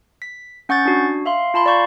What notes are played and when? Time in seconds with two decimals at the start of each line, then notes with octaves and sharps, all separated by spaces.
0.22 B6
0.69 C#4 F#5 C#6 G6 A6
0.85 D4 F#4
1.26 E5 F5 C6
1.54 F4 A5 B5 C6
1.66 D5 F5 C#6 G6